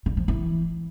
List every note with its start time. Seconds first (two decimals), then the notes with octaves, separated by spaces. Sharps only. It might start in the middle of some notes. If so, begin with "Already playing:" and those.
0.06 D3
0.17 F3
0.28 E3